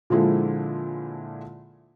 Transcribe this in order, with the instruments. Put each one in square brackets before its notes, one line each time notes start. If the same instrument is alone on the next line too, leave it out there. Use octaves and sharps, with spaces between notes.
[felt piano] A#2 D3 F3 G#3 E4 A4